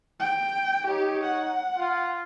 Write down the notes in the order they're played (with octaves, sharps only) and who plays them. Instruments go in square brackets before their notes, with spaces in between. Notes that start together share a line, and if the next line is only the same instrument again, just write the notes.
[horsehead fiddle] G5
[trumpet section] D#4 C#5 [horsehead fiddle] G4
[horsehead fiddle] F#5
[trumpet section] F4